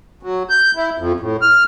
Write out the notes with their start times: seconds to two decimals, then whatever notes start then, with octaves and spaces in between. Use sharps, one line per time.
0.23 F#3
0.49 G6
0.76 E4
0.98 F2
1.20 A2
1.42 F6